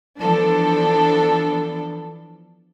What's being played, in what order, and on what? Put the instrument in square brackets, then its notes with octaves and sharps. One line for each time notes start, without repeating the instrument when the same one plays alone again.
[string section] E3 F3 B3 D4 A4